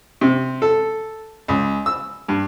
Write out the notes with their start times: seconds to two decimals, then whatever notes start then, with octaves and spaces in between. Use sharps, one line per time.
0.21 C3
0.62 A4
1.48 C#2
1.86 E6
2.28 G2